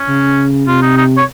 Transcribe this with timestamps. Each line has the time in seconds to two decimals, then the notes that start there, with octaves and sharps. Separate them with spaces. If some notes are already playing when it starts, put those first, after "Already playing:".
Already playing: C#4
0.08 C#3
0.67 C3 F4
0.82 D#4
0.97 D#4
1.17 C#5